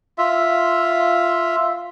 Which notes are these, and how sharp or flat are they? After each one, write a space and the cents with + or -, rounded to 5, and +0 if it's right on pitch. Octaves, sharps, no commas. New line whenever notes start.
F4 +0 E5 +0